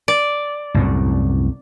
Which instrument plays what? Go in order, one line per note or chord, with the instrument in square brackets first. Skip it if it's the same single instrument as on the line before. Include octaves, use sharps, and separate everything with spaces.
[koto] D5
[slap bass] C2 F#2 A2